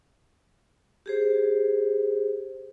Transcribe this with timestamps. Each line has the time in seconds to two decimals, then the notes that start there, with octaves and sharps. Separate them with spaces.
1.06 G4 G#4 C5